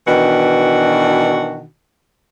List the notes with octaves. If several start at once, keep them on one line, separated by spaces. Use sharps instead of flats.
B2 D#3 E3 D4 F#4